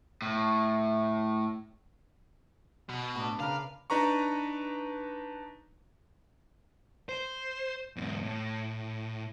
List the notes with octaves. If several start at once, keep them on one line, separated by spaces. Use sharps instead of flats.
A2
B2
A2 D4 B5
C#3 D4 A#4 B4 F5
D4 D#4 B4 A#5 C#6
C5
E2 G#2
A2